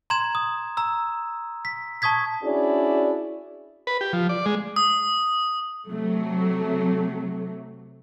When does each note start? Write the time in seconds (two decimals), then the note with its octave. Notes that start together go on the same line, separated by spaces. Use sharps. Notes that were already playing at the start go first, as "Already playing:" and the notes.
0.10 A#5 C6 G#6 E7
0.35 D#6
0.77 A#5 E6
1.65 B6
2.02 A5 C#6 D#6 G#6 B6
2.43 C#4 D4 E4 F#4 G#4 D5
3.87 B4
4.01 G4
4.13 F3
4.29 D5
4.46 G#3
4.76 D#6
5.88 C3 F#3 A3